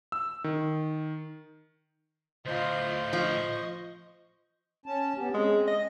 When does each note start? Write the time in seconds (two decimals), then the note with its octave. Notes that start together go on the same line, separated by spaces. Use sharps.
0.12 E6
0.44 D#3
2.46 D2 A2 F4 C5 D#5
3.13 F3 D#5 C#6
4.86 C#4 A5
5.18 B3 C#4 G4
5.34 G#3 C4 C#4
5.68 D#5